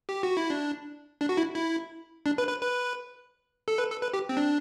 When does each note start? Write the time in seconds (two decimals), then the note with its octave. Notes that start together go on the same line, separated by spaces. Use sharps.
0.09 G4
0.23 F#4
0.37 E4
0.50 D4
1.21 D4
1.29 F#4
1.37 E4
1.55 E4
2.26 D4
2.38 B4
2.49 B4
2.61 B4
3.68 A4
3.78 B4
3.90 A4
4.02 B4
4.14 G4
4.29 C4
4.37 D4